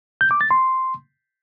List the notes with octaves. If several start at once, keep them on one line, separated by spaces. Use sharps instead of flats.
G6
D6
A6
C6